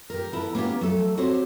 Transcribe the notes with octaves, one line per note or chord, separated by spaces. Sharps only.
G4 A#4
B3 E4 A4 A#4
A#3 B3 C#4 D#4 G4
F#3 A3 A4
C4 F#4 G4 C5 C#5 F#5